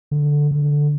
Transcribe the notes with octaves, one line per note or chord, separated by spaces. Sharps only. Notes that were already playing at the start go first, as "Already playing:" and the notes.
D3
D3